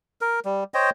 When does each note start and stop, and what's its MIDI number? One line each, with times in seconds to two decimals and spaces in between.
0.21 0.40 70
0.45 0.64 55
0.74 0.90 72
0.74 0.90 73
0.74 0.90 75
0.74 0.90 79